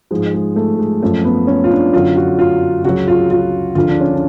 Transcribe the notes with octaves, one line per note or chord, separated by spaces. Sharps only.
G#2 F3 G#3
G#3
A3
G#3
F#2 F3 A3
B3
C#4
F4
D4
F#2 D3 F#3 F4
F#4
F4
C#2 C#3 F#3 F#4
F4
F4
D2 D3 F3 F4
D4
C#4
D4